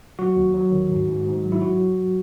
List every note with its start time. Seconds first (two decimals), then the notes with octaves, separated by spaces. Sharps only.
0.19 F#3 F#4
0.36 D#2
0.54 F#3
0.72 D#3
0.89 G#2
1.08 G#2
1.26 G#2
1.43 F#3
1.52 E4
1.61 F#3 F#4